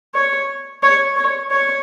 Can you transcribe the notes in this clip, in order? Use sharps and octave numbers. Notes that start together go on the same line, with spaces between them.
C#5
C#5
C#5
C#5